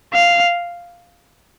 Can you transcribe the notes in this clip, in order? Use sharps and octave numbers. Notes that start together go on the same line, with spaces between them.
F5